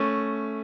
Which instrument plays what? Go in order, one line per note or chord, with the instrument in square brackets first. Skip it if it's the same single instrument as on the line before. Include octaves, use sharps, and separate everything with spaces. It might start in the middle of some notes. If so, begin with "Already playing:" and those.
Already playing: [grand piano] A3 C#4